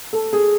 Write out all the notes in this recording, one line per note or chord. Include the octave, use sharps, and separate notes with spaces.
A4
G#4